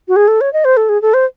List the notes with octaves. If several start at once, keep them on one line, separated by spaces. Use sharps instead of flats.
F#4
G#4
A4
C#5
D#5
C5
A4
G#4
A4
C5